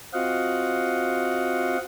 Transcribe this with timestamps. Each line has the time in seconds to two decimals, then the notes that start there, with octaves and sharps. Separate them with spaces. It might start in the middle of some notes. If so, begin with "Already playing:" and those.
0.13 C4 F4 F#4 D#5 F5 F#5